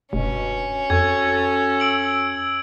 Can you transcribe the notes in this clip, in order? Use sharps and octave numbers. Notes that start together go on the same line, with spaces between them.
F1 G2 B2 C#4
F2 F#4 A4 G#6
E6 D7 F#7